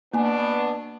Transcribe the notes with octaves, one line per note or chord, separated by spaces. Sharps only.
B2 A#3 B3 D4 G#5